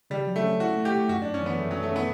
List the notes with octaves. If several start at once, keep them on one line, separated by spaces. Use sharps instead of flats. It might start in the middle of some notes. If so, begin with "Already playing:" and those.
C#3 G3
F#3
A3
C#4
E4 F#4
A3
G4
A3
F#2 F#4
D4
F#2
C#4
E3 B3
F#2 A3
F#3
C#4
A3
B3 C#4